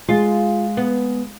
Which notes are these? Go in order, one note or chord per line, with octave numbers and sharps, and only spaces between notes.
G#3 F4
B3